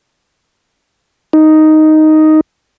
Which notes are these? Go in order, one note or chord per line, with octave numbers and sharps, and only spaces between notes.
D#4